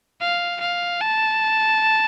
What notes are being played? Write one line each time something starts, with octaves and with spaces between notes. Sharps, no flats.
F5
F5
A5